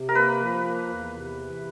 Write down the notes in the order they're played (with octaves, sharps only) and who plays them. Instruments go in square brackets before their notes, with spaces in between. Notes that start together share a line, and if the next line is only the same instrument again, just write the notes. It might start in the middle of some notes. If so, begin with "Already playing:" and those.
Already playing: [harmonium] C3
[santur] A#4
[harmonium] A#3 [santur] B4
[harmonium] F3
A#3
E2
C3
E3